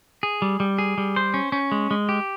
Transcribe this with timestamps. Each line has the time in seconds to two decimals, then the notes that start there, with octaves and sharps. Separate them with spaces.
0.23 G#4
0.42 G3
0.60 G3
0.78 G#4
0.98 G3
1.16 C5
1.34 C#4
1.52 C#4
1.72 G#3
1.91 G#3
2.09 G4